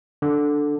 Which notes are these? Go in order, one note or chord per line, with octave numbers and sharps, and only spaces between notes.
D3